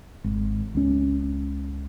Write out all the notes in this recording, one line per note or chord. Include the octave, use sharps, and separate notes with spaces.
G#1
C#2 C#4